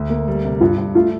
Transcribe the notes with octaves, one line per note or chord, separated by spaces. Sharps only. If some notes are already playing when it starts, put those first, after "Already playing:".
Already playing: D2
A#3
G3
C3
G2 F4
G2
A3 F4